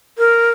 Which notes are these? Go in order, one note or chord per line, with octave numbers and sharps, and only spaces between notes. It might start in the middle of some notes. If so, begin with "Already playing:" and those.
A#4